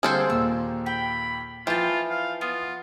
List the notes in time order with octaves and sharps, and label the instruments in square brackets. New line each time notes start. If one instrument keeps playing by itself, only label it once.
[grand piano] D3 G3 [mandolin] A#3 C4 [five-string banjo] G#4 A4 C5
[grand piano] D#2 A#2 D#3 [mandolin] E6
[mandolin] G5 [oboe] B5
[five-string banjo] E3 [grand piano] F3 [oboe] F4 [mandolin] G5 A5
[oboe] F5
[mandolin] B3 [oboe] F4